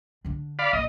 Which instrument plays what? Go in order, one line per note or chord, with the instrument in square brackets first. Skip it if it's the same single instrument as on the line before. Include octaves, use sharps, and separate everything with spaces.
[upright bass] D3 D4
[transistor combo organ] D5 F5 B5
[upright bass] A#1 [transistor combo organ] D#5